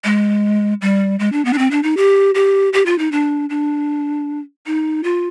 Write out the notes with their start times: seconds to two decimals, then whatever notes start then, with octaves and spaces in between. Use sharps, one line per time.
0.04 G#3
0.82 G3
1.19 G#3
1.32 D4
1.45 B3
1.53 D4
1.58 C4
1.71 D4
1.83 D#4
1.97 G4
2.35 G4
2.73 G4
2.86 F4
2.99 D#4
3.12 D4
3.50 D4
4.66 D#4
5.04 F4